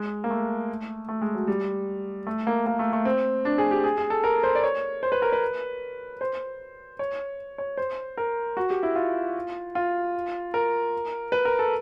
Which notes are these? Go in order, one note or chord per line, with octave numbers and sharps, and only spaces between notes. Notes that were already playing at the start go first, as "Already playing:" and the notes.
Already playing: G#3
A#3
A3
A3
G#3
F#3
G3
A3
A#3
A#3
A3
A3
C4
D4
G#4
G4
G#4
G#4
A4
A#4
C5
D5
C#5
C5
B4
A#4
B4
C5
C#5
C#5
C5
A#4
F#4
G4
E4
F4
F4
A#4
B4
A#4
A4